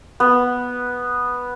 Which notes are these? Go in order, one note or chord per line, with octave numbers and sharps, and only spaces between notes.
B3